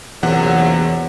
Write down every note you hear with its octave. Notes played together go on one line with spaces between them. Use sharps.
A#1 E2 C3 E3 F#3 F#5